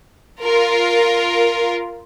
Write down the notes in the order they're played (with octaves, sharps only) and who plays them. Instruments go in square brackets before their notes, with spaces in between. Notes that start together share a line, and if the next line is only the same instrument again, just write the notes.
[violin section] F4 A#4